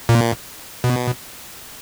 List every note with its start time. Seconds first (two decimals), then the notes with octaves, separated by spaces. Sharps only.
0.09 A#2
0.84 B2